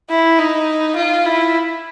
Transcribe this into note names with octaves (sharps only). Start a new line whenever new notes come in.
E4
D#4
F4
E4